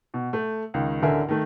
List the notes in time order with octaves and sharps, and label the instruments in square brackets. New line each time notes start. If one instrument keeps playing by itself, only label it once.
[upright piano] B2
A3
C#2 D#3
A1 D2 D3 A#4 E5 G#5
D#3 A3